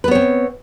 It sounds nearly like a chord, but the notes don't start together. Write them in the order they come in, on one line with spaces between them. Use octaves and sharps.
B4 B3 C#5 C4